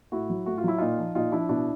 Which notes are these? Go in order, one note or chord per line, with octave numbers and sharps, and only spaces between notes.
A2 E4 F#4
F#3
A2 F#4
F4
F#3 E4
A#2 D#4 F4
F3
A#2 D#4 F4
F3 D4 E4
B2 D4 E4